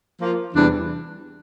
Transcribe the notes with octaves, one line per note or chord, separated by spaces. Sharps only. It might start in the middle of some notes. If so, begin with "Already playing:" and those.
F3 A#3 F4
E2 C3 E3 G3 D4